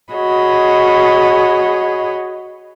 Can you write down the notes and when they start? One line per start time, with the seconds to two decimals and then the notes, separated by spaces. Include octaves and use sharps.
0.12 F#4 G#4 C#5 D#5 B5